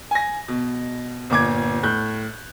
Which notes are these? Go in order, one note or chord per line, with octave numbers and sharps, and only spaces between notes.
G#5 A#6
B2
G1 A#2 D6 G#6
A2 F#6 G6